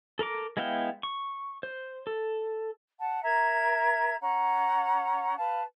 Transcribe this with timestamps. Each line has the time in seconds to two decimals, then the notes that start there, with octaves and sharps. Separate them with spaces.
0.19 A4 A#4 A#5 D6
0.57 G#3 B3 E4 F5 G5
1.03 C#6
1.63 C5
2.07 A4
2.99 F#5 A5
3.23 A#4 E5 A#5 G#6
4.21 C#4 F#5 A#5
5.37 B4 F5 A5